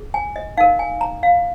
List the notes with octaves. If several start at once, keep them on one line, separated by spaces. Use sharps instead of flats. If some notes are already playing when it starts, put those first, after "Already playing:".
Already playing: G#4
G#5
D#5
D#4 A#4 F5
G#5
A#5
F5